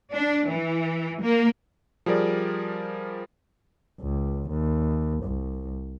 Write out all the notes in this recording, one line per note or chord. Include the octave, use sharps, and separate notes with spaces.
D4
E3
A#3
F3 G3 G#4 A#4 D5
C#2
D#2
C2